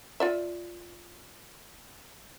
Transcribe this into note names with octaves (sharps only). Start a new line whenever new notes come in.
F4 D5 E5